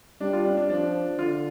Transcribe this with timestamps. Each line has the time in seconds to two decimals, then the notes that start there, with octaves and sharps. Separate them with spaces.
0.20 G3 D4
0.33 F4
0.45 D4
0.57 D4
0.70 F3 D4
1.18 D3 F4